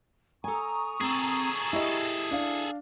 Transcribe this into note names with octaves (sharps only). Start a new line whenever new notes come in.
A4 G#5 A#5 C#6 D#6
C4 G#4 A4
E4 G4 D#5
D4 F5